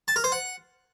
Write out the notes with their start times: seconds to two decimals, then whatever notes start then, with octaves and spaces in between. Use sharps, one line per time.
0.08 A5
0.16 A#4
0.24 C5
0.32 F#5